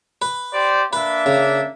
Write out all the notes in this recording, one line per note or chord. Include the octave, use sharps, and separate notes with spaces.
B4
G4 C5 D5
A#3 D4 B4 E5
C#3